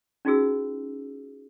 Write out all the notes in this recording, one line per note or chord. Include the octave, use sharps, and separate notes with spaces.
C#4 D#4 F4 F#4 G#4 E6